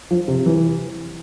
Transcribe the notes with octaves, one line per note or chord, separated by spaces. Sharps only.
F3
C3
E3